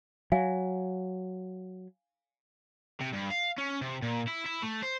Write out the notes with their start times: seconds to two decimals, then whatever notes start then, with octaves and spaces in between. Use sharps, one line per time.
0.32 F#3 F5 G#5
3.00 C3
3.13 G2
3.30 F5
3.58 C#4
3.81 C3
4.02 A#2
4.28 E4
4.46 E4
4.63 A3
4.83 C5